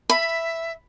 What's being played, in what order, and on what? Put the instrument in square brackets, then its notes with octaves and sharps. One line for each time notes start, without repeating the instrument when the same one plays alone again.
[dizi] E5 [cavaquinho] B5